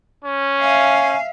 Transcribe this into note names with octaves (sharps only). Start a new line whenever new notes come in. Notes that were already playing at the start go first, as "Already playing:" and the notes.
C#4
E5 F5 G#5